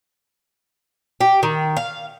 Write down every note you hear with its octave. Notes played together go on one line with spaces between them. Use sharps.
G4
D#3
F5